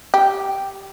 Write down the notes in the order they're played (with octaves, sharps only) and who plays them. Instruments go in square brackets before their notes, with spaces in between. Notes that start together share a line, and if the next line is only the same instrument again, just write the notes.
[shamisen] G4